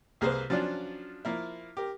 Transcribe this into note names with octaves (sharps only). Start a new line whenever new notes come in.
C2 A#3 G#4 B4 C5
F3 F#3 C#4 D4 F4
F3 A#3 E4
G4 A#4